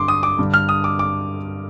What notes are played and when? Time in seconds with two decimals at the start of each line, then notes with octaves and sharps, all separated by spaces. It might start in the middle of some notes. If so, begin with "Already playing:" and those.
Already playing: G2 D3 C6 D6
0.08 D#6
0.23 D6
0.39 G2 D3
0.54 F6
0.69 D#6
0.84 D6
0.99 D6